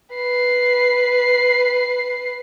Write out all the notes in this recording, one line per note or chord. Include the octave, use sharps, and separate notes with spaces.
B4 C7